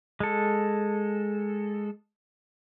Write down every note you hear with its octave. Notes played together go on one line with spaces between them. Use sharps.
G#3 A4